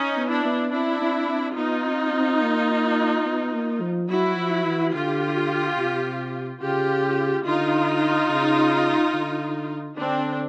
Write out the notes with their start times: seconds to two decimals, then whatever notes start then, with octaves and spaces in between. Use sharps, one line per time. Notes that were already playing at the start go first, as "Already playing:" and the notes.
Already playing: C#4 D#4
0.17 B3
0.31 D4 E4
0.45 B3
0.72 C4 D4 E4
1.02 C4
1.28 C4
1.56 B3 D#4 F4
1.85 C4
2.13 C4
2.42 A#3
3.26 B3
3.53 A#3
3.81 F3
4.09 F#3 E4 F#4
4.37 F3
4.65 E3
4.93 D3 F4 G4
5.77 C3
6.61 C#3 F4 G4
7.45 D3 D#4 F4
8.29 C#3
9.14 D3
9.98 D3 C4 D4